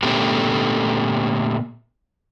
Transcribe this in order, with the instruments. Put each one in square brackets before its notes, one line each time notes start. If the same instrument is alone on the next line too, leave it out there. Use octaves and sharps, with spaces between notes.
[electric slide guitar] A#2 D3 A3 B3 C#4 G4